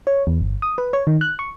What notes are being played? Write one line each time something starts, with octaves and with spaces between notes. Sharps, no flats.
C#5
E2
G1
D#6
B4
C#5
D#3
F#6
C#6